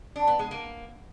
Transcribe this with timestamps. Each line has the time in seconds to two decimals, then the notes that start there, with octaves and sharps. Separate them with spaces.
0.16 D4
0.27 B3
0.39 G#3
0.51 A#3